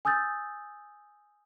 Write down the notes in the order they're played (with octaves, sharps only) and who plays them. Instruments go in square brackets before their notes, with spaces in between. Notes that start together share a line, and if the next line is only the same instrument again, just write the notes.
[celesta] G#5 D#6 E6 G6 A6